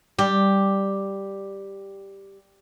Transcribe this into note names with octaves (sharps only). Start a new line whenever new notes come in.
G3 G4